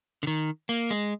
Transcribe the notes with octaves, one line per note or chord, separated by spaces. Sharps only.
D3
D#3
A#3
G#3